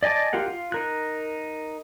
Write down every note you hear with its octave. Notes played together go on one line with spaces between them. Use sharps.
D5 D#5 G#5 A5 D6
F4 G4 A#4 F#5
F4
D#4 A#4 F#6